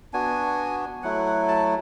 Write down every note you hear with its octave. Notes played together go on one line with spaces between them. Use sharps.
B3 D4 F#4 G#5
F#3 A3 E4 F#5
F#5
A5